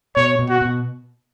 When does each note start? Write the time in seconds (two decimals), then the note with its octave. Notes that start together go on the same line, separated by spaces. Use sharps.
0.16 B2 C#5
0.39 B2
0.50 F#4
0.62 B2